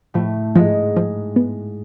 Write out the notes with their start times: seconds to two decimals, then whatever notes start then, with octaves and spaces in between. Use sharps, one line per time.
0.14 A2 F3 A3
0.55 G#2 F3 G#3
0.97 F3
1.36 B3